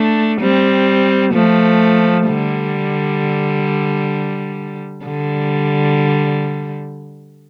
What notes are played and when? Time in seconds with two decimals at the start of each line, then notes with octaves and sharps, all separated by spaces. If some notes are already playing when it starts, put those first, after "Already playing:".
Already playing: A3 D4
0.41 G3 C4
1.34 F3 A3
2.28 D3 G3
5.05 D3 G3